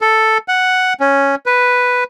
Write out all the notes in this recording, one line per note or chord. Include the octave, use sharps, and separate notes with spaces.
A4
F#5
C#4
B4